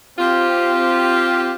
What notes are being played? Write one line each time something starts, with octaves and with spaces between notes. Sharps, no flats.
C4 F4 G4